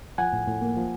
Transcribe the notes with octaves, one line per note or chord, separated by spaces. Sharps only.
F3 F#5 G#5
A2
A2
A#3
F3